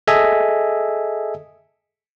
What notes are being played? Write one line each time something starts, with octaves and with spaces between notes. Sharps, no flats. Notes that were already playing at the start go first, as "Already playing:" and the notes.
G#4 A4 D#5 E5 G#5